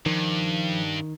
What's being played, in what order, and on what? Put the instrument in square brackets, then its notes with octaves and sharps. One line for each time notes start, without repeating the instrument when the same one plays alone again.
[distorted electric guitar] G2 [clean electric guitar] D#3 [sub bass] F3